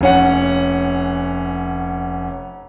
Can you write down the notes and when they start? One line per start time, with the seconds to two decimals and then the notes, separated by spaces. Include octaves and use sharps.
0.01 F1 C#4 F#5